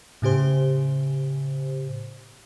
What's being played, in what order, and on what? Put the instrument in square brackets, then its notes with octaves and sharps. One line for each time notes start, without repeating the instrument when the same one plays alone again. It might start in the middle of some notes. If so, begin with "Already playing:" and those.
[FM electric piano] A2 C#3 G4 C5